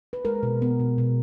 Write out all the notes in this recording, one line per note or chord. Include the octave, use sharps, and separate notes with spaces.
B4
G#3 A#4
B2
B3
B2
B2